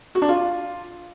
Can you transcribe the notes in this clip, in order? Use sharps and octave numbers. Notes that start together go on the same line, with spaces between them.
F#4
D4
F4